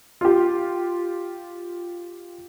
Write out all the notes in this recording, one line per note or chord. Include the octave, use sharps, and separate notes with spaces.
F4 G4